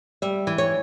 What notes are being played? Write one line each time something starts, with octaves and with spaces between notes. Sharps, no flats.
G3 E5
E3
C#5